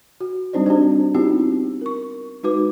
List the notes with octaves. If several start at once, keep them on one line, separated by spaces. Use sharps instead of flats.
F#4
G3 C4 D4 D#4 C5 D5
D4 F#4 G4 C5
B3 C4 D#4 E4 F#4 G4
A#4 C#6
G#3 D#4 F#4 B4 D6